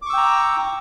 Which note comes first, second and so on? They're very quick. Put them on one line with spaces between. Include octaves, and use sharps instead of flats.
D6 C#6 E6 G5 A#5